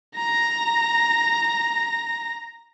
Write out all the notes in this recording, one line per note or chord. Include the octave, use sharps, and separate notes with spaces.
A#5 A#6